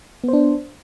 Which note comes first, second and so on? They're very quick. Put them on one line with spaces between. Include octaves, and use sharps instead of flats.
B3 C5 D4